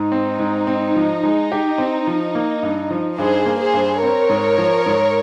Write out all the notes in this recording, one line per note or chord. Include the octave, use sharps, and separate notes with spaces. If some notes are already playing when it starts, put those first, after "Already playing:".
Already playing: G#2 D#4
C4
G#2
C4
F3
G#3
G4
C4
F3
A#3
G2
F3
G2 G#4 C5
A#3
G#4 C5
G2
C4 A#4 C#5
G#2
F3
G#2